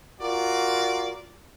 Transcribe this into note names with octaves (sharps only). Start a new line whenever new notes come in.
F4 F#4 A#4 D5